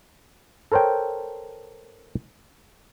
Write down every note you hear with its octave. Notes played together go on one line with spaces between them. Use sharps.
A4 A#4 C5 C#5 G5